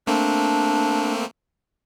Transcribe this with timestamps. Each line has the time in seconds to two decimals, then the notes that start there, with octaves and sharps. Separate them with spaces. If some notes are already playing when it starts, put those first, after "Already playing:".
0.07 A3 A#3 C4 D4